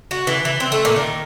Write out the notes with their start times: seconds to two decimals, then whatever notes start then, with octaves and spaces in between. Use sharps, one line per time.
0.11 F#4
0.27 E3
0.45 E3
0.60 C4
0.72 A3
0.85 A#2
0.96 D#3